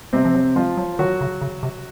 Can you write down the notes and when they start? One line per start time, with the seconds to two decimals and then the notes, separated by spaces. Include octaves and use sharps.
0.13 C3 G#3 C4
0.25 F3
0.34 F#3
0.56 F3 G#3 F4
0.77 F#3
0.99 D#3 F#3 F#4
1.21 C#3
1.41 C#3
1.63 C3